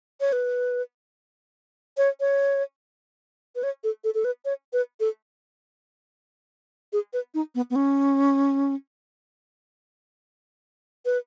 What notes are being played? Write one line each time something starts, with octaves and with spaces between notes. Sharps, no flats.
C#5
B4
C#5
C#5
B4
C#5
A4
A4
A4
B4
C#5
B4
A4
G#4
B4
D#4
B3
B3
C#4
B4